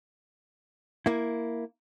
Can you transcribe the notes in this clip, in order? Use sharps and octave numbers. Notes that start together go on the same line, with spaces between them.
A#3 E4